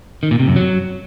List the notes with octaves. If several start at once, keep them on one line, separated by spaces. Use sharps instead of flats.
D#3
A#2
C3
F#2
F#3